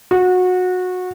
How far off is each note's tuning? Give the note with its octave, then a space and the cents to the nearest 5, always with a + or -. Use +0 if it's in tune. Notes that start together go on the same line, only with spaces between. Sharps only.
F#4 -20